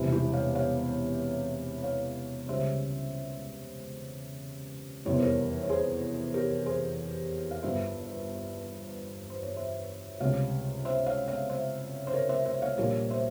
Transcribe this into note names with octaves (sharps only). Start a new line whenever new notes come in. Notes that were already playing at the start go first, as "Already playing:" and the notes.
Already playing: E1 E2 C3 G3 E4
E4 G4
C#5 F5
C#5 F5
C#5 F5
C#2 C#3 G3 C5 E5
F1 E2 E3 G3 C#5
C5
A#4 C#5
C#5
G#4 C5
G4 A#4
G#4 C5
F5
G1 G2 G3 C5 E5
C5
C#5
C5 E5
C#2 C3 G3 C#5 F5
C5 E5
C#5 F5
C#5 F5
C5 E5
C5
A#4 C#5
C5 E5
C5 E5
C#5 F5
A#1 A#2 G3 A#4 C#5
C5 E5